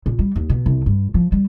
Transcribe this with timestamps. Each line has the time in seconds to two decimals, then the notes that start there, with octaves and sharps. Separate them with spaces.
0.06 A#2
0.19 G3
0.36 D#2
0.49 B2
0.66 C2
0.86 G2
1.14 F3
1.32 G3